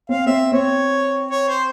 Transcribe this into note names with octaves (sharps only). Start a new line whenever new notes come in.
C4 F5
C4 E5
C4 C#5
C#5
C5